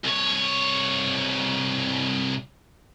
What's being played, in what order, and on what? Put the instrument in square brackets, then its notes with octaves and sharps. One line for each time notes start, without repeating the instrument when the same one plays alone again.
[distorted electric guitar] C2 C#5